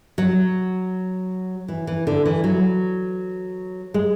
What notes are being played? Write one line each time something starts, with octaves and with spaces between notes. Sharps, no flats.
F#3
E3
E3
D3
E3
F#3
G#3